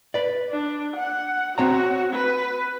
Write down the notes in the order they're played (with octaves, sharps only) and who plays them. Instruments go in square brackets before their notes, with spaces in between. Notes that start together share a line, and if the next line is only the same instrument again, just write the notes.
[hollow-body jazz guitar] B4 D5
[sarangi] D4
F#5
[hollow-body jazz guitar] C4 C#5 A#5 [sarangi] F#4
[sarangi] B4